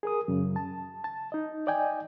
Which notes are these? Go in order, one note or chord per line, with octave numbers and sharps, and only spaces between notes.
G#4 A#4 D#6
F#2 C#3
A5
A5
D#4 D#5
D5 D#5 G5 G#5